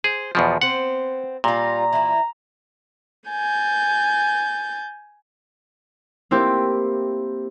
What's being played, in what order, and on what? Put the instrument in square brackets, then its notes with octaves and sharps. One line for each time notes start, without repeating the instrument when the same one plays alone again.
[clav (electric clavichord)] G#4 [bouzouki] C5
[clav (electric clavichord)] E2 B2 F3 [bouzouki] F#3
[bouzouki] B3 C4 C5 [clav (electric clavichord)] F#5
[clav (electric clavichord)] A#2 [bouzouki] G3 F4 [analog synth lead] A#5
[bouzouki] E3 E4
[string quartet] G#5 G6 A6
[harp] A#3 C4 E4 G4